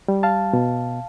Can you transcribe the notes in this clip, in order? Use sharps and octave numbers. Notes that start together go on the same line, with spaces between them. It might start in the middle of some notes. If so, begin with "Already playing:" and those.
G3
F5 A5
B2